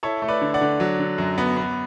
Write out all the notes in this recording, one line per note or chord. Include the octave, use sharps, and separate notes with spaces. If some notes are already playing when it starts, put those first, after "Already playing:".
E4 A4 C#5
A3
B4 D5
D3
D5 F#5
D3
F#3
D3
F#2
B3
B3